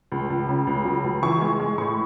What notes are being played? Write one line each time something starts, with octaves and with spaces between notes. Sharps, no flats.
C#2
C#2
C#3
C#2
F#3
C#2
E3 C#6
G#3
G#3
A2 C#6